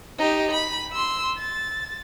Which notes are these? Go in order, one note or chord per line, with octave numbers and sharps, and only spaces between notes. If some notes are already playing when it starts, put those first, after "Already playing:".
D#4 G4
B5
C6 E6
A6